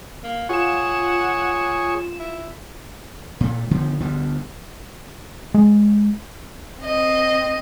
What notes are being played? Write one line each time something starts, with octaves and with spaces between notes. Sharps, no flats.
A#3
F4 G#4 C#5 F#5 E7
E4
A#2 A3
D3 D#3 F3 B3
D2 D3 G3 B3
G#3
C4 D#5